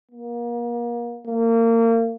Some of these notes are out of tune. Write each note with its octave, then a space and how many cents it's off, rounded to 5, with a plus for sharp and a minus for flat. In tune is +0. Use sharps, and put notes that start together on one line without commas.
A#3 +30
A#3 -30